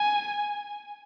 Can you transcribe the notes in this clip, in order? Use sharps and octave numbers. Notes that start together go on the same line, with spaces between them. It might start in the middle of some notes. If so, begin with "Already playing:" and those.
Already playing: G#5